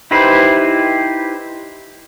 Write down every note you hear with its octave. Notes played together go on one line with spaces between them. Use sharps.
D#4 E4 G4 B4 C5